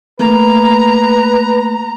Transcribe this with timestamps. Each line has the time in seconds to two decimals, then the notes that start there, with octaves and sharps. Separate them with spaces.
0.19 A3 A#3 B4 A#5